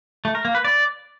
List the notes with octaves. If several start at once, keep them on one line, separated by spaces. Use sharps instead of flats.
A3
A#4
A#3
B4
D5